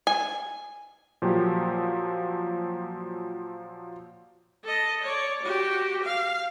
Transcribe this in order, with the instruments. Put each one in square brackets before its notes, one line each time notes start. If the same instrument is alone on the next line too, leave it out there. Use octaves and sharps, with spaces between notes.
[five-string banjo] G#5
[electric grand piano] A#2 F3 F#3 G4
[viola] A4 D#5
C#5 D5
F#4 G4
F5